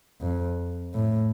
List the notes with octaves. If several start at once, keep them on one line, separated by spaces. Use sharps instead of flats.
F2
A2